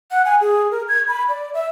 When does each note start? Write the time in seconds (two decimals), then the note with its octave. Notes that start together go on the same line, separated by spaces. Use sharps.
0.11 F#5
0.25 G#5
0.41 G#4
0.71 A#4
0.88 G#6
1.08 B5
1.29 D5
1.53 E5